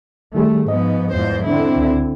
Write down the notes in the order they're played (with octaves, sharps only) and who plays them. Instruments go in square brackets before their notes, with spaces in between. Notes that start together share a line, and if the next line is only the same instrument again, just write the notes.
[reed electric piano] D#3 G3 G#4 [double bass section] A3
[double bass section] G#2 [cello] F3 B3 [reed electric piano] D#5
[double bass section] E2 F3 [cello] G#2 C5
[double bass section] D3 C4 [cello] E4
[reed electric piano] C#2